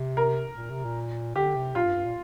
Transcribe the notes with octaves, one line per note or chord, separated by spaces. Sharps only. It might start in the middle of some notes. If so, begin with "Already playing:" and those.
Already playing: C3
A#4
A#2
C3
A#2
D3 G4
C3
A#2 F4
G2
G2
A#2